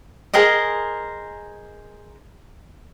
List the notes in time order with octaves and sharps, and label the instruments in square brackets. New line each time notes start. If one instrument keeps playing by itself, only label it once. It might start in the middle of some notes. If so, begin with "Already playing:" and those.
[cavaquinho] G#4 A#4 C5 D#5